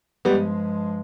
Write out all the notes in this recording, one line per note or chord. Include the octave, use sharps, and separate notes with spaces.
G2 F3 G3 G#3 B3